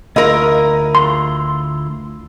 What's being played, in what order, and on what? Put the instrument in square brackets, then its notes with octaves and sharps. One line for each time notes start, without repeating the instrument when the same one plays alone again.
[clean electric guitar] D2 E4 F4 [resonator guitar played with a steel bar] A#4 D#5
[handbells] C6